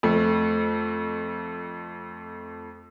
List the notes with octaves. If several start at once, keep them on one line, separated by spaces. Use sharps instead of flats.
F2 A3